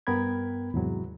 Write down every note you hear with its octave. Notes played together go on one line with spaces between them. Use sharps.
G2 B3 A#4 G5 B5 G#6
E2 G#2 C3 F#3